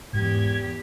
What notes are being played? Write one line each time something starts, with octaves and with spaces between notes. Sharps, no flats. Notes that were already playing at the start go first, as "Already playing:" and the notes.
E2 G#2 G4 G#6